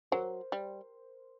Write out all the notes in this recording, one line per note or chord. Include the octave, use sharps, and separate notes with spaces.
F#3 A#4 C5
G3